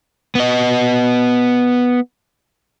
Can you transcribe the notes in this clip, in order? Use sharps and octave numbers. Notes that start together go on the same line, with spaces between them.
B3 D#5